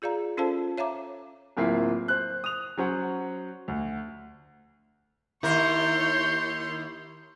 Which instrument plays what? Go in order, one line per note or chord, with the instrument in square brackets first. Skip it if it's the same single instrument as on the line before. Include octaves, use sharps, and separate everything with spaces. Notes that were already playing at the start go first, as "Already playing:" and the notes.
[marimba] F4 G#4 D5 F5 A#5
C#4 F4 A4 C5 F5 A5
C#5 E5 F5 A#5 D6
[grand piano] D1 A#3 C4 E4 F4 C7
C5 F#6
D#6 F7
F#3 C#4 C5 F#5
D2
[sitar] D#2 A#4 [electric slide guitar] E4 [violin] C#5 C6 [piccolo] G6